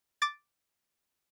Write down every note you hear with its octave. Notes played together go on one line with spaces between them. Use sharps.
D6 A6